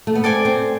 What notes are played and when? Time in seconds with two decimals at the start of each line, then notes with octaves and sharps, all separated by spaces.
0.07 A3
0.15 B3
0.24 C4 A4 D5 G#5
0.45 C4